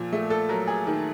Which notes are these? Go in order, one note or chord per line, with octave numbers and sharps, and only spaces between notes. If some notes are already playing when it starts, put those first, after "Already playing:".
Already playing: A#2 F3
A3
A4
F#3 A#4
G#4
D#3